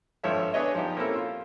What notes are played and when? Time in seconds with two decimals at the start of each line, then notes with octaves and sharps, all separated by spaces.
0.24 G#1 G2 F3 A4 C#5 E5
0.54 B3 D4 G#4 B4 C#5 D#5
0.75 F3 G3 D#4 G4
0.97 A#3 C4 C#4 E4 A4 A#4
1.15 F4